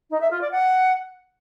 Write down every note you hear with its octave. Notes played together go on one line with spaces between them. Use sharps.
D#4
E5
F4
D5
F#5